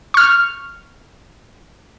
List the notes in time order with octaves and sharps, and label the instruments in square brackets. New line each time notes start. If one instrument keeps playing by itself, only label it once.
[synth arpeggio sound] C#6 F6